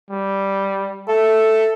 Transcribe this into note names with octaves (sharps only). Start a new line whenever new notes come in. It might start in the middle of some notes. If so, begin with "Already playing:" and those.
G3
A4 E5